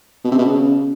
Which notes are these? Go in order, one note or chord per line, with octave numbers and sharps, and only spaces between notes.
B2
C3
B2
C#3